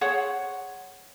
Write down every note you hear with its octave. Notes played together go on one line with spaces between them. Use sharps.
G#4 C5 C#5 F#5